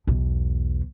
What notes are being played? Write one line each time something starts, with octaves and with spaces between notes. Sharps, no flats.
B1 E2